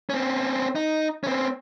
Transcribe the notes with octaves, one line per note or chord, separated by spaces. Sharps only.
C4 C#4
D#4
C4 C#4